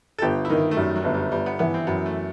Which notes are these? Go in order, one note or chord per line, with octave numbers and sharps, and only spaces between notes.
A4
G1 G4
E4
D#3 D#4
A3
F#2 G3
F#3
G1
G3
G1 G3
B3
E3 B3
C4
F#2 B3
A3